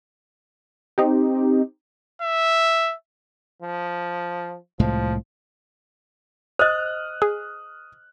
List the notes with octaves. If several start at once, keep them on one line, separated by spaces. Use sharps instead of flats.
C4 D#4 G4
E5
F3
C2 A2 F3 G#3
C5 D#5 D#6 F6 F#6
G#4